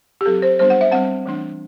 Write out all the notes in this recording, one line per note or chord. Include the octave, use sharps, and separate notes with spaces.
G4
F#3 C4 A4
C5
G3 B3 D4 C5
F#5
E5
G3 C4 F#5
E3 A3 D4